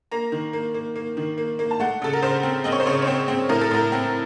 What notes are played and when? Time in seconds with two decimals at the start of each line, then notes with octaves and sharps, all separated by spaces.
0.12 A#3 A#5
0.32 D#3
0.53 A#3
0.74 A#3
0.96 A#3
1.17 D#3
1.38 A#3
1.59 A#3
1.71 A5
1.80 A3 F#5
2.02 C#3 A4
2.13 A#4
2.22 C#3 C5
2.43 C4
2.64 C4 D#5
2.72 C#5
2.80 C5
2.86 C#3 C#5
3.02 C#5
3.07 C4 C5
3.28 C4
3.49 A2 A#4
3.61 A4
3.71 A2 A#4
3.92 C4